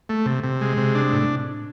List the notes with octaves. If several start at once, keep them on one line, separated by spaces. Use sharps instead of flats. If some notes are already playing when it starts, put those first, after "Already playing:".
A3
C3
C3
G#3
C3
D4
A2